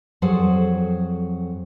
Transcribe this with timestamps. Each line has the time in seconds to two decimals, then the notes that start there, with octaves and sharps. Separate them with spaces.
0.22 F2 F#3 G#4 A4 C5